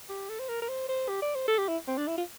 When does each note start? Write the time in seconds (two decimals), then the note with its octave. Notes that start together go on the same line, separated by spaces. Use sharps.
0.09 G4
0.29 A4
0.40 C5
0.49 A#4
0.62 A#4
0.69 C5
0.89 C5
1.08 G4
1.22 D5
1.35 C5
1.48 A4
1.58 G4
1.68 E4
1.88 C4
1.98 D4
2.08 E4
2.18 F4